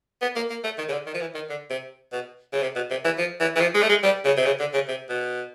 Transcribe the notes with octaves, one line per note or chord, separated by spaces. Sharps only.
B3
A#3
A#3
A3
D#3
C#3
D3
D#3
F3
E3
D#3
D3
C3
B2
C#3
C3
B2
C3
E3
F3
E3
E3
F3
G#3
A3
G#3
G3
C#3
C3
C#3
D3
C#3
C3
B2